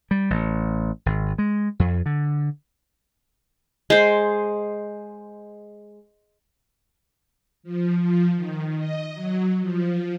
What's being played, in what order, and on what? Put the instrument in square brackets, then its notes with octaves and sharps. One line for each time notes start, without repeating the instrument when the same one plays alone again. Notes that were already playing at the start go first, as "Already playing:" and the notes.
[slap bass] G3
A1
G#1
G#3
F2
D3
[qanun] G#3 C5
[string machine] F3
F3
D#3
D#5
F#3
F3